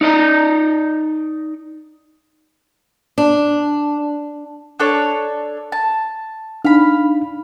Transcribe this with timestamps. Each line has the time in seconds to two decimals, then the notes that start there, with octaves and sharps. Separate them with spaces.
0.01 D#4 D5 D#5
3.18 D4
4.79 D4 A4 C#5
5.72 A5
6.65 D4 D#4 F5 B5